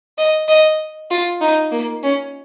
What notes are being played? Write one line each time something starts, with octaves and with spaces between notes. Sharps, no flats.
D#5
D#5
F4
D#4
A#3
C#4